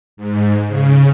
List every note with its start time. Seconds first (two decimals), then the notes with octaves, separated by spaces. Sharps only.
0.17 G#2
0.67 C#3